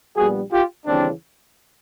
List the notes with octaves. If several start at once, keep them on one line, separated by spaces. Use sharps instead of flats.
A#1 A#2 G3 B3 F#4 G#4
F4 G4
D#2 C#3 E3 G3 C4 D4